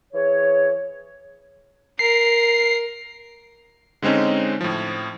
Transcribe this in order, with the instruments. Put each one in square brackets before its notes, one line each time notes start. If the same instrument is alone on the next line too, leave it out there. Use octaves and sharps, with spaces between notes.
[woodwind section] E3 G#4 C#5
[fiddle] A#4 [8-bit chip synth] C7
[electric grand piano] D3 G#3 C4 C#4 D#4
A2 F3